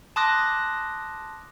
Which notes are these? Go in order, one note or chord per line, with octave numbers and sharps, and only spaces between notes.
A5 C6 D6 D#6 F#6 A#6